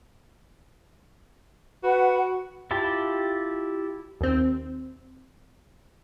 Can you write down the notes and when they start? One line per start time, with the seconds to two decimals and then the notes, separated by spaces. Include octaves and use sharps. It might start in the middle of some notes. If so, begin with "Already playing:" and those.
1.83 F#4 B4 F#5 B5
2.71 E4 F4 G4 A5
4.21 D#2 C4